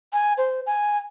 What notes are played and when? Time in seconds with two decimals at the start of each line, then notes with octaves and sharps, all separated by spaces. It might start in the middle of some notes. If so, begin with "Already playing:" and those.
0.13 G#5
0.38 C5
0.66 G#5